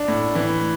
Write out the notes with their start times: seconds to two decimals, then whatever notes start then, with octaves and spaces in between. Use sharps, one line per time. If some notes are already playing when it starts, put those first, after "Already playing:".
Already playing: D4
0.08 A2
0.35 E3